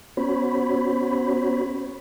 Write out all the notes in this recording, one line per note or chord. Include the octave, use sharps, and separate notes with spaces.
B3 C#4 F#4 C5 C#5 B5